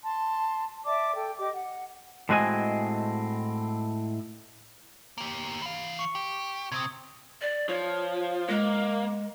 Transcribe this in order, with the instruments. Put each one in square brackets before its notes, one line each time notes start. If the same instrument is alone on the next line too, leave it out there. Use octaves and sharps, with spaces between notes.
[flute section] A5 C6
D5 E5 A5 D6
A4 G5
G4 D#5 D6
F#5
[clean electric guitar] A2 G#3 C4 F#4 D#5 G#5
[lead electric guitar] A#3 G4
E3 F5
[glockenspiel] C#6 C#7
[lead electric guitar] G4
[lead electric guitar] C3 C4 [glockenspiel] D#6 G#6
[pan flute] D5
[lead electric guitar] F3 [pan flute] C#5
[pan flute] G#3 [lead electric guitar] A#3